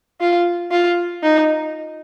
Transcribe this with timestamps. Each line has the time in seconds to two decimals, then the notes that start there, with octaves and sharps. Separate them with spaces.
0.20 F4
0.71 F4
1.23 D#4